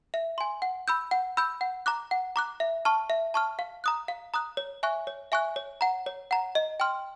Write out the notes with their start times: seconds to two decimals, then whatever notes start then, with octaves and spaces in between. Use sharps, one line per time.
0.14 E5
0.38 G#5 C6
0.62 F#5
0.88 B5 E6 G6
1.11 F#5
1.37 B5 E6 G6
1.61 F#5
1.86 A#5 D6 F#6
2.11 F#5
2.36 A#5 D6 F#6
2.60 E5
2.85 A5 C#6 F6
3.10 E5
3.34 A5 C#6 F6
3.59 F5
3.84 A#5 D#6 F#6
4.08 F5
4.34 A#5 D#6 F#6
4.57 C#5
4.83 E5 G#5 C#6 F#6
5.07 C#5
5.32 E5 G#5 C#6 F#6
5.56 C#5
5.81 F#5 A#5
6.06 C#5
6.31 F#5 A#5
6.55 D#5
6.80 G5 C6 F6